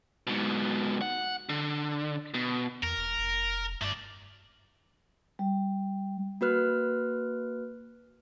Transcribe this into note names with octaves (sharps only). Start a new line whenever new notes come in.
G#2 B2
F#5
D3
B2
E2 A#4
E1
F1
G2 A3 D5
G3
A#3 F#4 B4 F6 F#6